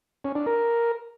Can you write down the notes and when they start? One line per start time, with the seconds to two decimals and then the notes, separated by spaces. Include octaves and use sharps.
0.24 C#4
0.35 D4
0.46 A#4